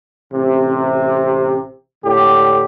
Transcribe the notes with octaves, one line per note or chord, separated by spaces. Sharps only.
A1 C3
A2 D3 G4